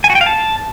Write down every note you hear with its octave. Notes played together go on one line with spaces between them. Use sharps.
G#5
F#4
G5
F5
A5